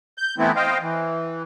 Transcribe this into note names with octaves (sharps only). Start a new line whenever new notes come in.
G6
E3 A3 B3 C4 E4
C5 D#5 F5 G5
E3